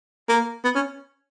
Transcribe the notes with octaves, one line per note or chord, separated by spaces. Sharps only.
A#3
B3
C#4